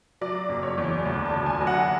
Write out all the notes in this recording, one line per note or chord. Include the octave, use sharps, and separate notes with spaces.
F#3 D5
F#1
C#5
E2
D2 D5
A5
D2
G#5
F#3
F#5